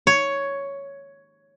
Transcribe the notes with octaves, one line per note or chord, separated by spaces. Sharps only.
C#5